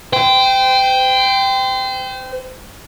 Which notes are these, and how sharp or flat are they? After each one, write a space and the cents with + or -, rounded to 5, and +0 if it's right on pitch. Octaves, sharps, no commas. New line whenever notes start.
C5 -30 G5 +0